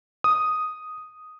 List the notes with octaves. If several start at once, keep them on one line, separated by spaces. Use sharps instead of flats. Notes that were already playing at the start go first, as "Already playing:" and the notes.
D#6